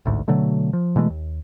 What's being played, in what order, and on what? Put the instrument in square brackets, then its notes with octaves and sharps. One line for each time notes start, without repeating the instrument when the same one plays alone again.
[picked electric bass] A1 D2 G#2
B2 D3 F#3 A3
F3
B2 E3 G#3 A3
D#2